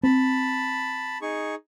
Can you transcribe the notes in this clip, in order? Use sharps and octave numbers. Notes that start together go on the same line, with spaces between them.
C4 A5 B5
D#4 G#4 C#6